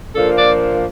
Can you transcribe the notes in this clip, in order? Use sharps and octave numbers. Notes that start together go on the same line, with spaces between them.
A#2 F3 A#3 D4 A4
D5